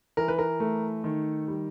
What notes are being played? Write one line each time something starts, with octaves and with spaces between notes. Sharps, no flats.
E3 A#4
B4
A#4
A3
D#3
G3